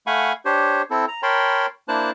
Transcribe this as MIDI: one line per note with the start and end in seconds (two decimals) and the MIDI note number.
0.07 0.33 57
0.07 0.33 77
0.07 0.33 78
0.07 0.33 80
0.07 0.33 83
0.07 0.33 85
0.45 0.82 62
0.45 0.82 67
0.45 0.82 72
0.45 0.82 73
0.91 1.05 60
0.91 1.05 64
0.91 1.05 69
1.08 1.21 82
1.23 1.66 70
1.23 1.66 73
1.23 1.66 79
1.23 1.66 81
1.23 1.66 83
1.23 1.66 84
1.88 2.11 58
1.88 2.11 62
1.88 2.11 64
1.88 2.11 72
1.88 2.11 81
1.88 2.11 90